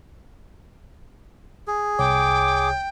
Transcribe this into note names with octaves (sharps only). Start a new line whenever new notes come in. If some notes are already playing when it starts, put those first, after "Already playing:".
G#4
C2 C#5 G5 D6